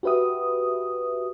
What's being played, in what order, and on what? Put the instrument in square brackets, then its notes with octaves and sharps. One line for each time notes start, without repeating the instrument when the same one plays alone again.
[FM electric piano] F#4 G4 B4 E5 D#6